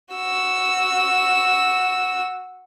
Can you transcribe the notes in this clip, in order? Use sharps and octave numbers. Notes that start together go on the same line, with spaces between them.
F#4 E6